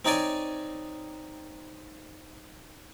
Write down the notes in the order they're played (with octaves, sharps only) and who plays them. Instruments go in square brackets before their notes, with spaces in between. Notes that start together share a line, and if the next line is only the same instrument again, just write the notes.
[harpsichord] C4 D#4 C#5 D5 G#5